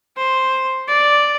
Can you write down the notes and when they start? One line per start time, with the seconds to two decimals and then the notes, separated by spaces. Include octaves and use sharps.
0.17 C5
0.88 D5